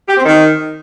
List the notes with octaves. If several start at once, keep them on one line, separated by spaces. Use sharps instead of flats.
G4
C4
D#3